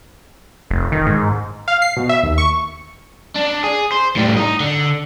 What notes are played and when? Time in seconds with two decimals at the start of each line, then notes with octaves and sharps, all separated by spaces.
0.71 F1
0.92 D#3
1.07 G#2
1.68 F5
1.82 C7
1.97 B2
2.09 E5
2.23 D#2
2.38 C#6
3.36 D4
3.64 G#4
3.92 C5
4.16 A2 G3
4.37 D#4 D#5
4.60 D3